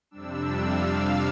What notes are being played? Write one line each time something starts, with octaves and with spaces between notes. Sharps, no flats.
F2 C3 G3 D4 E6
F5